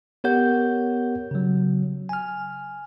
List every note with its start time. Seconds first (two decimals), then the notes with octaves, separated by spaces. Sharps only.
0.24 B3 G4 A#4 C#5 F#5 G6
1.31 C#3 F#3
2.09 G#5 F6